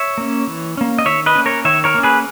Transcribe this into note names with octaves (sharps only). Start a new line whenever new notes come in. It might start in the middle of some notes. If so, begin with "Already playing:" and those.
Already playing: C#5 E5
A#3 C#4
E3
A#3 C#4
D#5
D#3 C#5 E5
B4 D#5
A#3 C#4
A#4 C#5
D#3 C#5 E5
A#4 C#5
A#3 C#4
G#4 B4